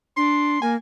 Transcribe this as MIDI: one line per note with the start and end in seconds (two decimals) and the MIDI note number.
0.17 0.58 62
0.17 0.58 84
0.62 0.75 58
0.62 0.73 80